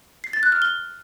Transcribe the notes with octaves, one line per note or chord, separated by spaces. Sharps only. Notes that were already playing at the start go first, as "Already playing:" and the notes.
C7
A6
F#6
F6
G7